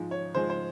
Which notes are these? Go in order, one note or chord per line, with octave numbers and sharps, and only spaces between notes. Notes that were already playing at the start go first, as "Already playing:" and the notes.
Already playing: G#2 F3 G#3
C#5
G#2 F3 G#3 C5
C5